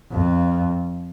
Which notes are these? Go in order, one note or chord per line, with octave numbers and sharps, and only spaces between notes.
F2